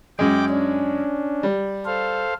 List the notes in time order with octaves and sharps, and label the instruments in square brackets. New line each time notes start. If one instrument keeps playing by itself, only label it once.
[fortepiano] F#2 G#3 [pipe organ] G5 D6
[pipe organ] C#4 D4
[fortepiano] G3
[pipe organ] A4 C5 F5